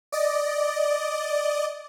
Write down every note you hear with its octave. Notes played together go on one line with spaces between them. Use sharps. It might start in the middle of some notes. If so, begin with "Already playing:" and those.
D5 D#5